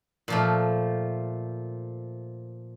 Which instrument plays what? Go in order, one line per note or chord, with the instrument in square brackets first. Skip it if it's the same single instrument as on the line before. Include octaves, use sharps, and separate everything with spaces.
[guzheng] A#2 F3 A3